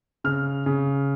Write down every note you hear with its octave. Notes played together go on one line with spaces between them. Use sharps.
C#3 F6
C#3